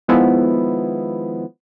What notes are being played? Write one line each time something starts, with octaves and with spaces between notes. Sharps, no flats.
D#3 F3 G#3 B3 E4